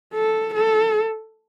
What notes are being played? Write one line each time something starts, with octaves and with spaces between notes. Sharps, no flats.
A4
A4